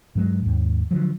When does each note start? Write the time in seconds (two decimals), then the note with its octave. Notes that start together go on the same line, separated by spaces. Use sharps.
0.15 G2 F#3 G#3
0.42 D#2 G#2
0.91 D3 F3 F#3